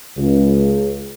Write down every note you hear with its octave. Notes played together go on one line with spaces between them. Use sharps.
C#2